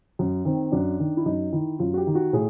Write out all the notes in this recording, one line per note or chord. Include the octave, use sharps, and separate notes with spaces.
F#2
D#3 C4
F#2 D4
D#3
E4
F#2 D#4
D#3 E4
F#2 F4
F#4
G4
D#3
F#4
A2 G#4